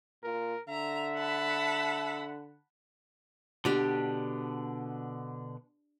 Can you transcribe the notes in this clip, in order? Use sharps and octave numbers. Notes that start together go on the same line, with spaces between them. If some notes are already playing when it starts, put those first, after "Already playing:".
A#2 A#4
D3 E5 A#5
F#5 A5 B5
B2 D3 D4 G4